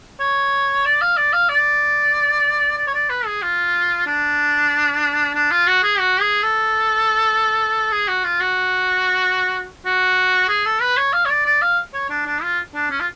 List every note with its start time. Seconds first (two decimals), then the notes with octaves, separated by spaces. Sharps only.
0.20 C#5
0.85 D5
1.01 F5
1.17 D5
1.33 F5
1.49 D5
2.78 D5
2.87 C#5
2.94 D5
3.09 B4
3.26 G#4
3.42 F4
4.07 D4
5.35 D4
5.51 F4
5.67 F#4
5.83 G#4
5.99 F#4
6.21 G#4
6.42 A4
7.92 G#4
8.08 F#4
8.24 F4
8.40 F#4
9.85 F#4
10.49 G#4
10.65 A4
10.81 B4
10.97 C#5
11.13 F5
11.25 C#5
11.29 D5
11.46 D5
11.62 F5
11.94 C#5
12.09 D4
12.26 D4
12.42 F4
12.74 D4
12.90 C#4
13.00 F4